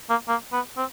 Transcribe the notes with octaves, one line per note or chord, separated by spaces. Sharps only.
A#3
A#3
B3
C4